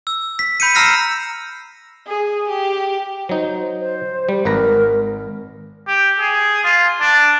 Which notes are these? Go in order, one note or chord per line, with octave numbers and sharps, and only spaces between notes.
E6
B6
B5 G6 C#7 D#7
A#5 E6 F6 A#6 C7
G#4
G4
F#3 D#4 C5
C5
G3
G#1 A#4 B4 A#5
G4
G#4
F4
D4